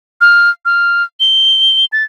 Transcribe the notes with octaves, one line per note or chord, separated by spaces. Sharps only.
F6
F6
G7
A6